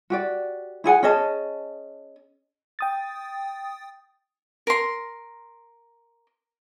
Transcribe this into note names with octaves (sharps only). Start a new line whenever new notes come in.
F#4 G4 D5
E4 G#4 F#5 G#5
C#4 G#4 D#5 A5
G5 D#6 A6
A#4 C6